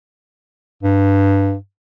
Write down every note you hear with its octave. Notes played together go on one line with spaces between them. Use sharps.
G2